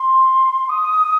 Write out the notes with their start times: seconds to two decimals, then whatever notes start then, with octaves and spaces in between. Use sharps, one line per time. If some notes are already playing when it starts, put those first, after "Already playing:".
Already playing: C6
0.69 D#6